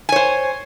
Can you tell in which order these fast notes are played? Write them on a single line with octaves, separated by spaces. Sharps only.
G#5 C#5 C5